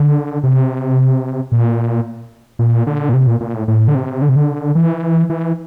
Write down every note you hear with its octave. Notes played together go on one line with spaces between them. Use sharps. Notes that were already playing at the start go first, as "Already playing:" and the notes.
Already playing: D3
C3
A#2
A#2
D3
A#2
C3
A#2
A#2
A2
A2
D3
C3
D3
C3
D3
E3
E3